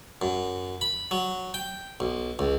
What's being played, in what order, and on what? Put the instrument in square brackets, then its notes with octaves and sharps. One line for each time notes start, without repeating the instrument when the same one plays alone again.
[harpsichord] F#2
B5
F#3
G5
B1
C#2